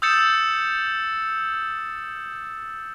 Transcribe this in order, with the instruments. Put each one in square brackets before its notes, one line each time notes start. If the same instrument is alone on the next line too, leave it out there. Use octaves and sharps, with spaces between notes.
[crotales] D#6 E6 G6 A6 C#7 E7